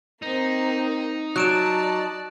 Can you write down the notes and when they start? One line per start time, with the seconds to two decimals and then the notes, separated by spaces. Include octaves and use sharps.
0.22 A#3 C4 D#4
1.36 F#3 D5 A5 F#6 D7 E7